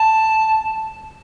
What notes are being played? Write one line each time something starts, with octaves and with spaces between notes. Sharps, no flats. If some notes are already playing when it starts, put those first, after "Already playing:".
Already playing: A5